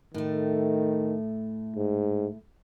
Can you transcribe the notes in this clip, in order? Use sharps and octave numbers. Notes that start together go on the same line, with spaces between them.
A2 D#3 A3
G#2